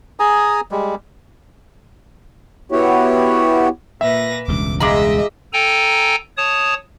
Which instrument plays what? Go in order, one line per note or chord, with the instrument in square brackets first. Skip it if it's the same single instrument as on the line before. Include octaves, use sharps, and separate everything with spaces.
[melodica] G#4 G#5 A#5 D#6
G3 G#3
[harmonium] B3 E4 F#4 G4 C#5
[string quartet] A#2 B4 A#6 [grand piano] E5
[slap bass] E1 C#2 G2 [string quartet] D6
[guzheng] G#3 F4 B5 [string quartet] D#5 E5 [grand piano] A#5 D6 A#6
[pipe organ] A4 G5 G#5 A#5
C#5 A5 D#6